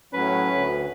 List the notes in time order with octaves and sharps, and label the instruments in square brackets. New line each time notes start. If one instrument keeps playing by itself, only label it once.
[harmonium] A2 F#3 [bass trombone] C#4 [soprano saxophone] B4
[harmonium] D2